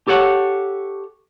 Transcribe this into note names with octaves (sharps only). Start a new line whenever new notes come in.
G4 A4 C#5 F#5